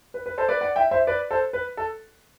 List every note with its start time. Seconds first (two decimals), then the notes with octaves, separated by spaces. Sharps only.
0.14 B4
0.26 B4
0.38 A4 C5
0.49 B4 D5
0.61 D5 F#5
0.76 E5 G5
0.91 C5 E5
1.07 B4 D5
1.31 A4 C5
1.53 B4
1.77 A4